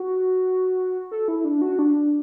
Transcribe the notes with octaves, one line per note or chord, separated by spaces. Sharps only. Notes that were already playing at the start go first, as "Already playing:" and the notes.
Already playing: F#4
A4
E4
D4
F#4
D4